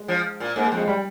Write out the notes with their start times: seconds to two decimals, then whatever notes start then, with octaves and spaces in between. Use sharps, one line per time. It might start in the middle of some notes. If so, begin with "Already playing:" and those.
Already playing: G#3
0.08 F3
0.40 A#2
0.56 G#2 A#3
0.66 G#3
0.72 F2
0.77 G#3
0.88 G3